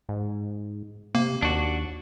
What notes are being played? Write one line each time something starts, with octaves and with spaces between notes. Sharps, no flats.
G#2
C3 A#3
D#2 D4 F#4